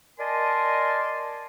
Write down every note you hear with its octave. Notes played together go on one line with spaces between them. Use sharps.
A#4 D5 D#5 G#5 A5 C6